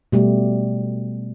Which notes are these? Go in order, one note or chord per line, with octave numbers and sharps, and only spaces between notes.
B2 G3 A3